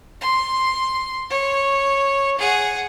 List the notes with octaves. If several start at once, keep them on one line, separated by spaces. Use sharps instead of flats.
C6
C#5
G#4 F#5